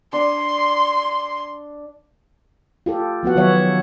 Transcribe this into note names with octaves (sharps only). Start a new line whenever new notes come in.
D4 C6
F4 G4 A4
F3 B3 F#4 F#5
D#3 F#3 B3 C#5 E5 F#5